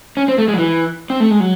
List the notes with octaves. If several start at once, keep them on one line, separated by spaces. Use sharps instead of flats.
C#4
C4
A3
G#3
F#3
E3
C4
A3
G#3
F#3